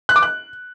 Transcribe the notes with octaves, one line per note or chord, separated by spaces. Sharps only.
F#6
D6
F#6